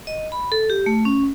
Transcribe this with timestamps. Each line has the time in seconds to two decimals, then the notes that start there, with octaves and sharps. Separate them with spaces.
0.07 D#5
0.32 B5
0.52 A4
0.70 G4
0.86 A3
1.05 C#4